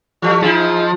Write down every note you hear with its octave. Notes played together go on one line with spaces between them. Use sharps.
E3 G3 A3
F3 D#4 E4 G#4